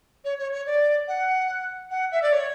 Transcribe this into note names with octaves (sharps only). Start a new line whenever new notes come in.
C#5
C#5
C#5
D5
F#5
F#5
E5
D5
C#5